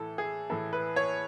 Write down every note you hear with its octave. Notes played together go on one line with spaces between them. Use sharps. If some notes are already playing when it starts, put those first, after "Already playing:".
Already playing: A2 E3 A4
G#4
A2 E3 A4
B4
C#5